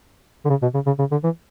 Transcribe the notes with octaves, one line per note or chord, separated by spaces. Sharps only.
D3
C#3
B2
C#3
C#3
C#3
D3
E3